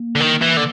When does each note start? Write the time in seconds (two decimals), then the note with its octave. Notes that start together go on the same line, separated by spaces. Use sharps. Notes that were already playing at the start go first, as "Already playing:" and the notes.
Already playing: A#3
0.16 D3
0.20 D#3
0.42 E3
0.57 D3